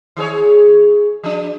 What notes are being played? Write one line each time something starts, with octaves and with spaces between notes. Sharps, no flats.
D#3 G#4 C#5
F3 D4